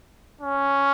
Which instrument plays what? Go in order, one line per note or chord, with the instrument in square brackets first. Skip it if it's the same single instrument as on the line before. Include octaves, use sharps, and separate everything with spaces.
[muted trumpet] C#4